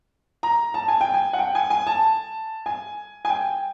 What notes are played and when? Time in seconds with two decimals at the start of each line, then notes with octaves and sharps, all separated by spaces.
0.43 A#5
0.74 A5
0.88 G#5
1.01 G5
1.14 G#5
1.33 F#5
1.39 G5
1.55 G#5
1.70 G#5
1.87 A5
2.66 G#5
3.25 G#5
3.30 G5